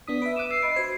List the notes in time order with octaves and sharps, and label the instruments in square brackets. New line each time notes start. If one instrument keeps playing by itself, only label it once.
[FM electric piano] B3 D4 D#6 [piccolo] B6
[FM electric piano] B4 E5 [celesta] D7
[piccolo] D6 [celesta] F#6 D#7 E7
[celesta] E6 [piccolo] C7
[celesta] D#5 B5 D7
[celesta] F#4 G#6 [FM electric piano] C5